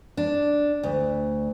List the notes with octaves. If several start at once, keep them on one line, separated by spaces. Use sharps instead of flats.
D4
D2